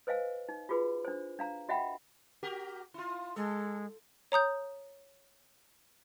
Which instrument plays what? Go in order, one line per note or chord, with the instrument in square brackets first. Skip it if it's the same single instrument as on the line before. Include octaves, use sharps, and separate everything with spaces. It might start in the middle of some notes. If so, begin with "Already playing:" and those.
[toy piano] B4 C5 D#5 F5 G#5
D#4
F4 F#4 G#4 B4
D4 C5
D4 F5 A#5
F#4 D#5 E5 F#5 G5 B5
[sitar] F#4 G4 A#4
E4 F4
[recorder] G#3 [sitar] A4
[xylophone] C#5 A#5 D#6 G6